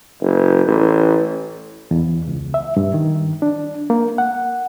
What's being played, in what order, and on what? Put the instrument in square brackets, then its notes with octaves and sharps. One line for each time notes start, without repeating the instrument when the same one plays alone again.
[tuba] F#1
A1
[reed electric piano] E2
C#2
E5
G2
D#3
D4
A#3
F#5